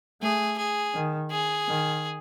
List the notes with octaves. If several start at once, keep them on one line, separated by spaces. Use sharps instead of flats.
A3 G#4
G#4
D#3
G#4
D#3